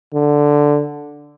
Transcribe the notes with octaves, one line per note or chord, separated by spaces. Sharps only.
D3